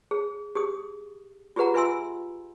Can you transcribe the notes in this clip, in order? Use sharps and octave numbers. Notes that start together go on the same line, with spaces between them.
G#4
G4 G#4 D#6
F4 G4 G#4 B4 F#5 A#5
F4 B4 E5 G#5 C6 E6